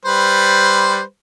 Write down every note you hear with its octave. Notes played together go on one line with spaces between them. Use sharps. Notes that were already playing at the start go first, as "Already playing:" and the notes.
G3 B4 C5